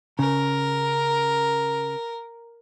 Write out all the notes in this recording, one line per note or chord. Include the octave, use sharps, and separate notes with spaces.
C#3 A#4